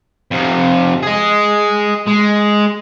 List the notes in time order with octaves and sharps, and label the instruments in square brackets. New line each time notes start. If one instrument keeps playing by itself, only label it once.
[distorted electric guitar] F2 C3
G#4 D#5
G#3